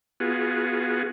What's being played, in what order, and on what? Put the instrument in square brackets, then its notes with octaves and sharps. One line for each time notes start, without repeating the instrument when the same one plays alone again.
[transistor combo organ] B3 F4 F#4 G#4